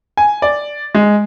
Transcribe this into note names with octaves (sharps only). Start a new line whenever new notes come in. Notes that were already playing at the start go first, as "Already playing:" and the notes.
G#5
D5
G#3